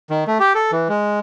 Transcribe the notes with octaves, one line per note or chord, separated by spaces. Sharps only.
D#3
A3
G4
A4
E3
G#3